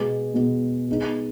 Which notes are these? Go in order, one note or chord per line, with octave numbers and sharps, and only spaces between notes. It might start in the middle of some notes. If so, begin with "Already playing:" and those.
Already playing: B2 G#3 B3
B2 G#3 B3
G#3 B3 D#4